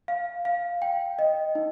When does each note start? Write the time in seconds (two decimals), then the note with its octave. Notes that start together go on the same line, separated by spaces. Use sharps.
0.08 F5
0.45 F5
0.82 G5
1.19 D#5
1.55 D#4